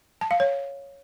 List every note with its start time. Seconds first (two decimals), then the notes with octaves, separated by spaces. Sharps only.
0.21 A5
0.31 F5
0.40 C#5